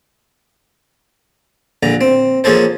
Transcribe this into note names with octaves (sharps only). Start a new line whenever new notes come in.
A#1 D3 A#5
C4
F3 A#3 C#4 G#4 A4 C5